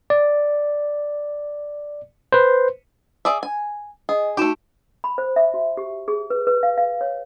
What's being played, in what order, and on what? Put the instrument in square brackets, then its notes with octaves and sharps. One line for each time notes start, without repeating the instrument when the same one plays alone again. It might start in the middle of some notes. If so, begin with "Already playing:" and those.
[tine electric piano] D5
B4 C5
[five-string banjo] G#4 D5 E5
G#5
[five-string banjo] G#4 [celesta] D#5
[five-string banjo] A3 G4 [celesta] D#4 F#4 E7
[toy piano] B5
C5
E5
F#4
G4
G#4
B4
B4
F5
F5
C#5